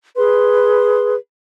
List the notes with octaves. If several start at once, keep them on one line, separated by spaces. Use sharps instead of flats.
G#4 B4 C6